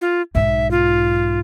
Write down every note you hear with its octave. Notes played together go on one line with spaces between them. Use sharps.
F4
B1 G#2 E5
F4